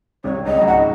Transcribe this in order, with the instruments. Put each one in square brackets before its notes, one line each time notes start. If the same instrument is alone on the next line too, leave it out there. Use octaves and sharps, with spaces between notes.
[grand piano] C2 C3 [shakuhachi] C#5
[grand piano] C#2 C#3 [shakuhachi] D#5
[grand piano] F#3
[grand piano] G#2 G#3 [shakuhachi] F#5